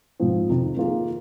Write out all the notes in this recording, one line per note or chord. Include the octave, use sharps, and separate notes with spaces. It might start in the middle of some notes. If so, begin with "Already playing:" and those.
G#2 F3 C4
F2 C3 D#3
D#3 A#3 F4 G#4